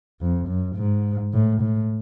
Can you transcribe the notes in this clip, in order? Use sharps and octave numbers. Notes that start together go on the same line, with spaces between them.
F2
F#2
G#2
A2
A2